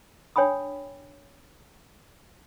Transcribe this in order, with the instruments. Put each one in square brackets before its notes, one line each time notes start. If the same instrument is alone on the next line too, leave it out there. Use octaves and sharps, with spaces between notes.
[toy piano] D4 C#5 G5 G#5 B5 D#6